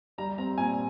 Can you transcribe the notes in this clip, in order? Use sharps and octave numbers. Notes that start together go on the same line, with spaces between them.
G3 A#5
C4 A#5
A#2 G#5